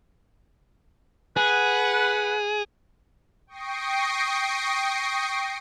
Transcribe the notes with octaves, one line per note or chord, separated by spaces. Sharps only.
G#4 B4 F#5
G5 C#6 D#6 A#6 C7 D7